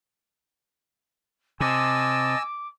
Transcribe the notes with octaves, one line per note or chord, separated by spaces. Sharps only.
C3 D#5 G#5 A5 D6 E6